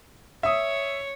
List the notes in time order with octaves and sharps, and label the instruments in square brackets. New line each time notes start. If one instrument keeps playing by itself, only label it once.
[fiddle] C#5 [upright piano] E5 D#6